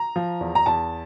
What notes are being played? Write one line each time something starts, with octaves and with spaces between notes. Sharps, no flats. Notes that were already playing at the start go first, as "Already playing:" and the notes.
Already playing: A#5
F3
E2
A#5
E2 A5